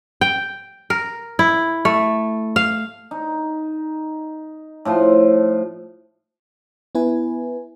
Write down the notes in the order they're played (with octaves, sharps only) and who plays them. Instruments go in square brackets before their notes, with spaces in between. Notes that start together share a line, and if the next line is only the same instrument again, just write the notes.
[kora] G5
A#4
E4
A3
F5
[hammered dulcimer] D#4
A2 F3 C6
[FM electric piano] B3 E4 B4 G#5